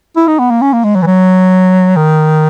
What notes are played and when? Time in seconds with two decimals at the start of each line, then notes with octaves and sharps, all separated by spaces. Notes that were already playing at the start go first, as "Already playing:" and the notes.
0.16 E4
0.28 D#4
0.39 B3
0.50 A#3
0.62 C#4
0.73 A#3
0.84 G#3
0.95 F#3
1.02 E3
1.07 F#3
1.96 D#3